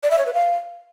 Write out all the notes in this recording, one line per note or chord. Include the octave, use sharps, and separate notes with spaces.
D5
E5
C#5
B4
F5